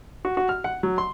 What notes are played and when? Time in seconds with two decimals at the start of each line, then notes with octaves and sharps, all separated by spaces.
0.25 F#4
0.37 F#4
0.49 F6
0.64 F#5
0.83 F#3
0.98 C6